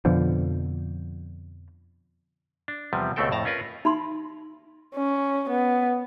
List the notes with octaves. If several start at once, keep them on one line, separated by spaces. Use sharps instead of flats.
F2 B2 D3 F3
D4
E2 C3 F3 G3
C#2 B2 A3 C4 A4 G5
F2 A2 A5 A#5
C#4 F4 A#4 B4
D#4 B5 C6
C#4
B3